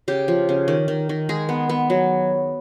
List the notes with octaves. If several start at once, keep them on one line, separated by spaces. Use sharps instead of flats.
C#3 G4
F3
C#3
D#3
D#3
D#3
G#3 G#4
B3
B3
F#3